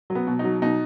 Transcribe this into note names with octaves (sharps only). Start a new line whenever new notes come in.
F#3
B3
B2
D#4
F#3
B2 D#4